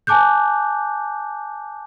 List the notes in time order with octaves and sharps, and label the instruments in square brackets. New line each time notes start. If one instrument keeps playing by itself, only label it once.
[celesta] G#5 A5 D6 F#6 G6